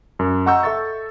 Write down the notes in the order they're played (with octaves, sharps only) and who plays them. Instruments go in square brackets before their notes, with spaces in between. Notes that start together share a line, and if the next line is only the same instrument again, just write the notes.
[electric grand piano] F#2
D#5 F#5 A#5 C#6 E6 G6
A4 E5 C#6 E6 A6